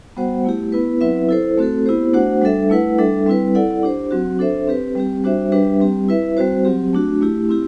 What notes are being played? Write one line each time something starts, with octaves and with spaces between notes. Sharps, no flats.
G3 B3 F#4 C5 F#5
A3 E4 G4
B3 E4 B4
F#3 C4 E4 B4 E5
E4 A4 C5
A3 C4 F#4 A4
B3 E4 G4 C5
A3 D4 F#4 C5 F#5
G3 D4 A4 E5
A3 E4 B4 F#5
G3 D4 A4 E5
G3 C4 E4 B4
E4 A4 D5 F#5
D4 G4 C5
F#3 C4 F#4
D4 A4 C5 E5
C4 G4 B4
G3 C4 G4
G3 D4 F#4 C5 E5
G3 D4 G4 B4 E5
G3 C4 G4
E4 B4 E5
G3 C4 F#4 C5
F#3 C4 G4
A3 D4 F#4
A3 E4 G4
C4 E4 G4